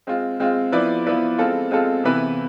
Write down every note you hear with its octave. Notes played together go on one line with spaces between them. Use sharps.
G#3 C4 F4
G#3 C4 F4
F3 B3 E4 B4 D5
F3 B3 E4 B4 D5
G#3 C4 F4 A4
G#3 C4 F4 A4
C3 E3 B3 E4 B4